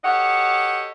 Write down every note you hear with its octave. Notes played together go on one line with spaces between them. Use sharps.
F#4 G4 A4 C#5 D#5 F#5